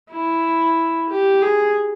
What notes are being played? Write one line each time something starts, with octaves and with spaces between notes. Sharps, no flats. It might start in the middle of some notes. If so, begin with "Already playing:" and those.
E4
G4
G#4